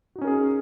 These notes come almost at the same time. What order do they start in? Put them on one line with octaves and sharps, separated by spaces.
F#4 D#4 C#4 A#4 G#4